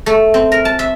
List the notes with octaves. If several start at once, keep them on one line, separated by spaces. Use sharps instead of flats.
A3
C4
A#4
A5
E5